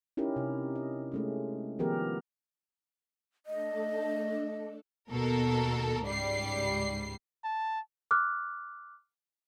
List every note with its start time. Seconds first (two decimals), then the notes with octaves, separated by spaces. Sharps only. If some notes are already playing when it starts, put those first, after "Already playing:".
0.17 C#4 D#4 E4 G4 A#4
0.36 C3
0.76 D#5
1.12 G#3 A3 C#4
1.79 D#3 F3 B3 G4 G#4 A#4
3.46 A3 D4 A4 D#5
5.11 D#2 B2 A4 A#4
6.03 C#2 G#2 G3 C7
7.44 A5
8.11 D6 F6 F#6